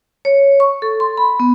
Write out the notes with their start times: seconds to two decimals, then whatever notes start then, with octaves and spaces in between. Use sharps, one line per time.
0.25 C#5
0.60 C#6
0.82 A4
1.00 C6
1.17 B5
1.40 B3